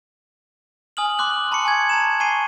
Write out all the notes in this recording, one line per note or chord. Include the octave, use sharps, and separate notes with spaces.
G#5 D#6 F6 F#7
C6 D6 F#6 F#7
A5 B5 C#6 D6 C#7
G#5 G#6
A5 A#5 E7
G#5 C#6 C7 D#7